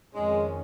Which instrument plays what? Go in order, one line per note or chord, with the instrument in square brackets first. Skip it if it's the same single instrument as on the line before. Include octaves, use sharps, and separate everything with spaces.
[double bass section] F2 D#3 C#4 [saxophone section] G#3